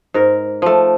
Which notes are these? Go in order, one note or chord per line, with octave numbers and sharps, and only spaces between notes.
G#2 A#4
F3 A3